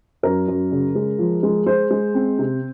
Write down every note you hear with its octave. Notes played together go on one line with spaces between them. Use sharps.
F#2 A#4
F#2
C#3
G#3
F3
G#3
G#3 C5
G#3
C4
C3